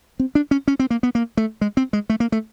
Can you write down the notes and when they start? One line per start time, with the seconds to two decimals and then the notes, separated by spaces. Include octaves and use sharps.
0.20 C4
0.35 D4
0.51 C#4
0.68 C#4
0.79 C4
0.90 A#3
1.03 B3
1.15 A#3
1.37 A3
1.61 G#3
1.77 C4
1.93 G#3
2.10 A3
2.20 A#3
2.32 A3